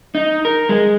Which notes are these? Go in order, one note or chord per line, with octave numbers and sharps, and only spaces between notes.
D#4
A#4
G#3